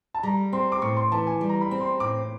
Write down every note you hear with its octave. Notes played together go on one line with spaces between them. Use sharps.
A5
G3 A#5
C4 C6
D6
A2 C#6
C6
E3 A5
G#5
G3
A#5
B5
C4
C6
A2 D6